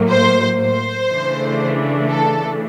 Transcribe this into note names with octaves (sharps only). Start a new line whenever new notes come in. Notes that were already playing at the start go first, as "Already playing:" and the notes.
Already playing: A2 F#3 A#3
C5
C5
C#3 E3 A3 D4
A4